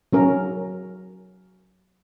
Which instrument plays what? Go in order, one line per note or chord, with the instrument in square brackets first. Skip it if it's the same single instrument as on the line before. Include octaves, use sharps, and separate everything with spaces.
[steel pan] F#3 C#4 A#4